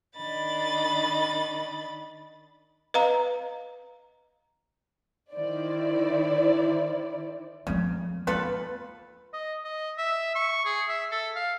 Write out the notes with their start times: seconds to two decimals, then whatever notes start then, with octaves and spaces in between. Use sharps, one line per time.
0.16 D#3 D4 D#5 B5 A6
2.94 B4 D#5 F5 A#5
5.33 D#3 E4 C5 D5
7.67 C#3 F3 A3
8.27 A#3 D#4 F4 A4 B4
9.33 D#5
9.64 D#5
9.98 E5
10.35 C#6
10.65 G#4
10.88 E5
11.11 A4
11.35 F5